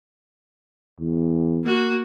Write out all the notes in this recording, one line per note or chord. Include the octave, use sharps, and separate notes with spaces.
E2
A#3 F#4